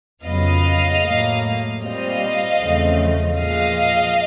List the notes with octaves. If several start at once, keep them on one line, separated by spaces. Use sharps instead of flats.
F2 C#3 F#3 B3 D#5 F5
A2 F#3 A#3
A#2 G3 C4 D#5 F5
E2 C#3 F3 A3 C4
A#2 F3 G#3 D#5 F5